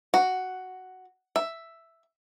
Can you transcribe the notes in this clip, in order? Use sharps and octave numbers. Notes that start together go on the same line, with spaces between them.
F#4
E5